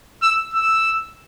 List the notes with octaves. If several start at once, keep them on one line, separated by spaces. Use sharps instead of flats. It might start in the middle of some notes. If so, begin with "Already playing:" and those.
E6
E6